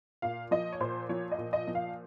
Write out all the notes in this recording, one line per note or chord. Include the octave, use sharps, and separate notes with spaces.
A#2 F5
F3 D#5
C#5
A#2 C5
F3 C#5
D#5
A#2
D#5
F3
F5